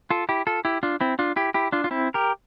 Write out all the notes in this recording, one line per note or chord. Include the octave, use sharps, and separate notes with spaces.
F4 A4
E4 G4
F4 A4
E4 G4
D4 F4
C4 E4
D4 F4
E4 G4
E4 G4
D4 F4
F4
C4 E4
G4 A#4